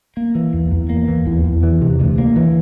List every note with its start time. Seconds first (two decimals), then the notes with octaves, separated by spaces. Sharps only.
0.17 A#3
0.35 E3
0.53 E2
0.72 E2
0.90 A#3
1.08 E3
1.27 E2
1.44 E2
1.63 E3
1.81 C3
2.00 D2
2.18 A#3
2.36 E3